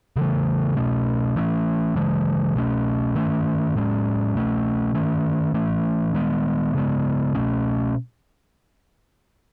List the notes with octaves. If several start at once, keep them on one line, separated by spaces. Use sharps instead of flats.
C#3 E3 A3
B2 A3 C#4
E3 A3 C#4
C#3 E3 G#3
B2 A3 C#4
D#3 A3 C#4
A2 G#3 C#4
B2 A3 C#4
D#3 A3 C#4
E3 A3 C#4
D#3 G#3 B3
C#3 G#3 B3
B2 A3 C#4